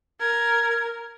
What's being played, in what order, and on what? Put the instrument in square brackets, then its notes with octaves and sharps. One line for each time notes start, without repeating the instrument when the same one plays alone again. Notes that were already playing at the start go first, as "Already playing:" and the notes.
[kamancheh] A#4 [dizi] G#6